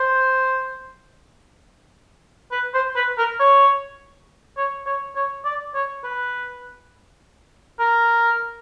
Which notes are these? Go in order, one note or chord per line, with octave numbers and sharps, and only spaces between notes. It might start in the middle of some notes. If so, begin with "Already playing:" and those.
Already playing: C5
B4
C5
B4
A#4
C#5
C#5
C#5
C#5
D5
C#5
B4
A#4